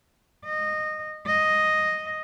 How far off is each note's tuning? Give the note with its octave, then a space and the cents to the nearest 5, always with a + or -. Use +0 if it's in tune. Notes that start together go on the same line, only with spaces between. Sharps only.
D#5 -15
D#5 +0